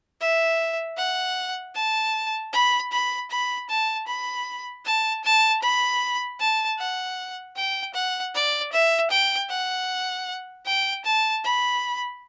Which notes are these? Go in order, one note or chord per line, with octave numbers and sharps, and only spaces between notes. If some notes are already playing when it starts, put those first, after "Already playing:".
E5
F#5
A5
B5
B5
B5
A5
B5
A5
A5
B5
A5
F#5
G5
F#5
D5
E5
G5
F#5
G5
A5
B5